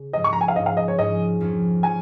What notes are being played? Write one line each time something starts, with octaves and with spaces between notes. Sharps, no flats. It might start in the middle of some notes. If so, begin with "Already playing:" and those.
Already playing: C#3
G#2 F3 G#3 D#5
C#6
A#5
G#5
F5
G#2 F3 C#4 D#5
F5
D#5
C#5
G#2 F3 C#4 D#5
F2 F3 C#4
F3 C#4 G#5